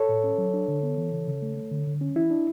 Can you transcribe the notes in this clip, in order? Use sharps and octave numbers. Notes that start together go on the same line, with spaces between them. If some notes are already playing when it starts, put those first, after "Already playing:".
Already playing: A4 C#5
A2
C#4
F#3
D4
D3
B3
E3
C#3
C#3
A3
A3
D3
D3
C#4
E3 E4
D4